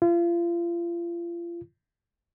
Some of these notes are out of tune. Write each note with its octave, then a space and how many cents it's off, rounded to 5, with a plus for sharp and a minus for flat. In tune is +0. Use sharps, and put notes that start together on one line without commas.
F4 -35